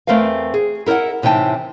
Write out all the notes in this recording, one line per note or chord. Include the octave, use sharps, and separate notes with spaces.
E2 A3 C4 A#4 B4 F5
G#4
E4 A#4 C5 D#5 F#5
A2 C3 E3 D#4 G5 A5